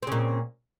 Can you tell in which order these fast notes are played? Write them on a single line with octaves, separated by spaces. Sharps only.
C4 C#3 A#2